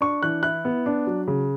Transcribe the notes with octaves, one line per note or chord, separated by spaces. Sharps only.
D4 C#6
E3 F#6
E4 F#6
B3
D4
F#3
C#3